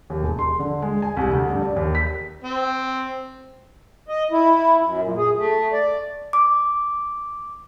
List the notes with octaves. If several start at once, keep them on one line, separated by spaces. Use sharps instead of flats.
D#2
E1
C6
D3
G#3
G#5
C2
D2
G2
D5
D#2
B6
C4
D#5
E4
F#2
A#2
G#4
A3
D5
D6